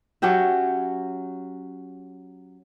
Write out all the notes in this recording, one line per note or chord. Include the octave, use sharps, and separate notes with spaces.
F#3 C#4 G4 E5